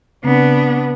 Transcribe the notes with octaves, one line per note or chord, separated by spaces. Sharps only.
C#3 B3 C4 D4